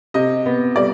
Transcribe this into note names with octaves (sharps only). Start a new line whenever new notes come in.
C3 D#5
B3
G3 D5